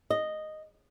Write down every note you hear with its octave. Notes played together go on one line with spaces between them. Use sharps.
D#5